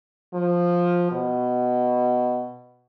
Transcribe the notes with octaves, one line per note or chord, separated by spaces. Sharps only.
F3
B2